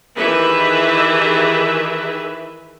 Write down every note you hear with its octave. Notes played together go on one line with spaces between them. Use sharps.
D#3 E3 G4 G#4 B4 E5